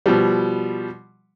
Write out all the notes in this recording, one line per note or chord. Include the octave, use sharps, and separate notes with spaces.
B2 F3 G3